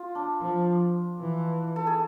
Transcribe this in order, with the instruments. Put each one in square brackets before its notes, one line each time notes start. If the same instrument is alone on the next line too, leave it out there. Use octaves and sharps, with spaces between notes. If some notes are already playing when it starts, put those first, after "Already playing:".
Already playing: [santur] F4
D4
[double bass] F3
E3
[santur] A4
G#4